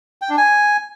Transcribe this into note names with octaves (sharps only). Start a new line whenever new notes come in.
G5
D4
G#5